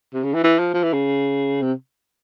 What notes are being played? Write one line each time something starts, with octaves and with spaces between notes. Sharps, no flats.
C3
C#3
E3
E3
F3
F3
E3
C#3
C3